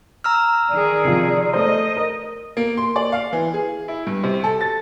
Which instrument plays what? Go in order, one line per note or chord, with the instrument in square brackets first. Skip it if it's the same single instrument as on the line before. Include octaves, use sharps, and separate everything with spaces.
[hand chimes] A#5 E6 F6
[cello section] D#3 G#4 [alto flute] D5
[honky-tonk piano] C3 F3
[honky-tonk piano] A3 C5 [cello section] D#5
[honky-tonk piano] A#4
[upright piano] A#3
C6
D5
F5
E3
G#4
E4
G2
C3
A4
A6